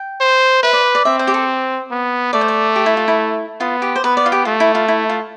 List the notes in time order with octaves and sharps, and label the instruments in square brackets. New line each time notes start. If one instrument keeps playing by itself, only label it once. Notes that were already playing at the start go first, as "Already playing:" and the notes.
Already playing: [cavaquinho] G5
[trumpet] C5
[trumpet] B4 [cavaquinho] E5
[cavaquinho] D5
D5
[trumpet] C4 [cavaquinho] E5
[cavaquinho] C5
G4
A4
[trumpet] B3
[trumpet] A3 [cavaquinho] D5
[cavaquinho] C5
D5
G4
E4
F4
E4
[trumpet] B3 [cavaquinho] F4
[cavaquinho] G4
C5
[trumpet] B3 [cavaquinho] B4
[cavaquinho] D5
F4
G4
[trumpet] A3 [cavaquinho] F4
[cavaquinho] E4
F4
E4
F4